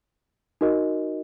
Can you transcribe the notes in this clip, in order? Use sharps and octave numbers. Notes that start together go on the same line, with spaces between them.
D#4 F#4 A#4 D#5